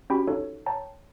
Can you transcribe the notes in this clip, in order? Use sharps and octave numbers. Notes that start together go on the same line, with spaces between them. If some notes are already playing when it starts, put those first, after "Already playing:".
C#4 F#4 G4 G5 B5
D#4 F4 A4 C#5
C#5 G5 A5 A#5